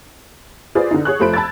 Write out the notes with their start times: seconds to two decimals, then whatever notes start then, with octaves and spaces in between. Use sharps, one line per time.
0.75 F4 G#4 B4 C5 D5
0.91 D3 D#4
1.05 G#4 C#5 F#6
1.19 F1 F3 A3 C5 B5 D7
1.33 A5 B5 E6 G#6 A6